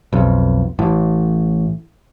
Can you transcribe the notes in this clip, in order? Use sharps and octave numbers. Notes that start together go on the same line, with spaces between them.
B1 F2
A1 A2